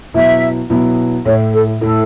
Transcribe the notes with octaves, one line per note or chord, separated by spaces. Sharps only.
B2 F#3 B3 E4 E5
B2 F#3 B3 E4
A2 A3 E4 C#5
A4
A2 A3 E4 A4